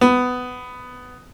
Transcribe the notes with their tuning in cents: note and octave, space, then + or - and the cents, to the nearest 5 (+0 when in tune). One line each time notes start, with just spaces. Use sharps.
B3 +15